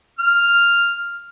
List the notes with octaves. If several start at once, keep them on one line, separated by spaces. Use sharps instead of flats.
F6